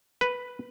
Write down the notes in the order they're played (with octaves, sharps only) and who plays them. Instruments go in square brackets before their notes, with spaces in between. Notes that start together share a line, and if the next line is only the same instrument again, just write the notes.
[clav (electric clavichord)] B4